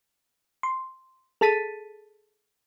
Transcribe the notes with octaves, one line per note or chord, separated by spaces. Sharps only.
C6
G#4 A4 A5 A6 B6 D#7